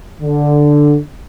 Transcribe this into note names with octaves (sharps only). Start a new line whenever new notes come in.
D3